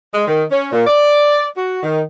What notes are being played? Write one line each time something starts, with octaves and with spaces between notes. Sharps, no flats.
G#3
D#3
C#4
A#2
D5
F#4
D#3